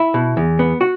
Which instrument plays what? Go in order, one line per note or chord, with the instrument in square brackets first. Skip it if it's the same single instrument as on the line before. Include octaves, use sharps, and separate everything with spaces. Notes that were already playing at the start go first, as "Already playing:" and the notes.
Already playing: [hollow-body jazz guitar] E4 E5
B2
E2
B3
F#4